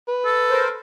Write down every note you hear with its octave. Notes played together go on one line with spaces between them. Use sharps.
B4
A4
A#4 C5